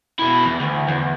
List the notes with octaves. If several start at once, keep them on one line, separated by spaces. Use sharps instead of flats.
B2 E4
E2
D2
E2